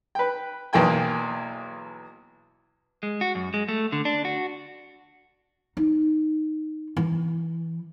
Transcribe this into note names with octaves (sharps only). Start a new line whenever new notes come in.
B4 G5
B1 E2 A#3 G5 G#5
G#3
F#4
F#2
G#3
A3
D3
D4
F#4
D#4
E3